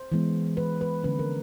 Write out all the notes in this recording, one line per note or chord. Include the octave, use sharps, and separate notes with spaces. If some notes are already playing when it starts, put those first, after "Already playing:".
Already playing: C5
E3 G#3 B3
B4
B4
D3 F3 A#3 C#4 B4
A#4